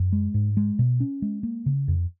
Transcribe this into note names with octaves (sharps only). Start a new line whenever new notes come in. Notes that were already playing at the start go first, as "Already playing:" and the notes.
Already playing: F#2
G#3
G#2
G#3
B2
C#4
G#3
A#3
C#3
F2